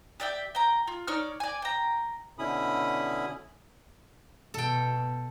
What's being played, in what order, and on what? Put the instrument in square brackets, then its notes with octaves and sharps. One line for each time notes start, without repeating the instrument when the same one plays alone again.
[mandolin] G4 D5 E5 G5
G5 A#5
F4
D#4 C#5 D5 F6
D5 G#5
G5 A#5
[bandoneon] B2 D3 C#4 E4 B5 D#6
[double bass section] B2 [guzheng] A4 G5